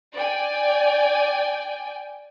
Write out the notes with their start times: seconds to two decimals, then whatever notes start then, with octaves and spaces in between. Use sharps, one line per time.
0.13 D5 G5 G#5